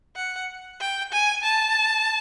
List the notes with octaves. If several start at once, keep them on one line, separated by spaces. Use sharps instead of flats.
F#5
G5
G#5
A5